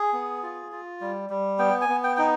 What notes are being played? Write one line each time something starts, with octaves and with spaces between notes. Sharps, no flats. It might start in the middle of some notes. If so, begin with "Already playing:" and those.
Already playing: G#4
B3
F4
F4
G3
G3
B3 G5
G#5
B3
G5
D#4 G5